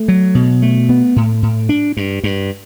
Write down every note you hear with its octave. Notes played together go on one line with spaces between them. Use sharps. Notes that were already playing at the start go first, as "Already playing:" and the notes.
Already playing: A3
F#3
B2
A3
B3
A2
A2
D4
G2
G2